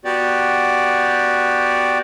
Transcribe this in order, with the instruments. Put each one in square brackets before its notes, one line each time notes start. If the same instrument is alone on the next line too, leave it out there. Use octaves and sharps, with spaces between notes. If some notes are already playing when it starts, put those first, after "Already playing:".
[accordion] B3 F#4 G4 D5